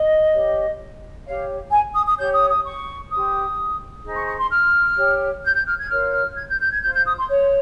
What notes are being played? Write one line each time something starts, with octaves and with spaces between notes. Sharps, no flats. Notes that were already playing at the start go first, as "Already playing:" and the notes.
Already playing: D#5
G4 C#5
G4 C#5 F5
G#5
D#6
D#6
G4 C#5 G6
D#6
D#6
C#6
G4 C5 D#6
D#4 G#4 C5
C#6
C#6
C6
F6
G4 C#5
G6
G6
F6
G#6
F4 A#4 C#5 F6
F6
G#6
G6
G6
G#6
F4 C5 G6
G6
D#6
C6
C#5